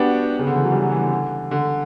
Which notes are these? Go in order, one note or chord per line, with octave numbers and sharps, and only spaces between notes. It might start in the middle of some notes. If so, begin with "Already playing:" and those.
Already playing: B3 D4 F#4 G4
C#3
D3
E3
F#3
G3
F#3
E3
D3
D3